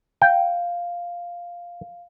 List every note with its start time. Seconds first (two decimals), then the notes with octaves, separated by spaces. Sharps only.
0.22 F5 G5